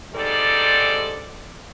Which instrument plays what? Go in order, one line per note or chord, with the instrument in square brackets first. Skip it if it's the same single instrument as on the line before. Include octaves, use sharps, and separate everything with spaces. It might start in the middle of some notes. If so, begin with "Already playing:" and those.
[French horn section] G#2 G3 C4 D#4 A4 D5